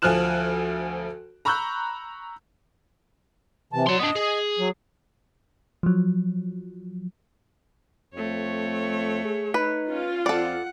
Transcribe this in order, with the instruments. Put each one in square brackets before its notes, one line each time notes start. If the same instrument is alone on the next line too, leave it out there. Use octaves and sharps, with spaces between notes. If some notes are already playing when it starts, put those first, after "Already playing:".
[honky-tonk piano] D2 F3 G#5 F6 F#6 E7
A#5 B5 C#6 E6 F#6 G6
[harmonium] C3 E3 A5
[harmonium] F#3 [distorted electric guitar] D5 C6
[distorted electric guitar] B3 D4 [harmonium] D#5
[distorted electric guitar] G#4
[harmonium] F#3
[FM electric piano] F3 F#3
[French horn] F2 [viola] A3 C#5
[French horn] G#4
[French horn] D#4 [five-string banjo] B4
[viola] C#4 [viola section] F4
[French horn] F2 [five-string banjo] A4 D5 [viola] F#5